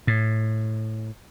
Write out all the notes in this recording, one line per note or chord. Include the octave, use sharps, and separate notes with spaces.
A2